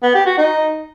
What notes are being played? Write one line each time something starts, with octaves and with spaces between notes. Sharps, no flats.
B3
G4
F#4
D#4